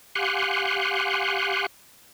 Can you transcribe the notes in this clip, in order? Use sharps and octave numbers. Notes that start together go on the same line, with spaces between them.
G4 F5 F#5 G#5 C6 F#6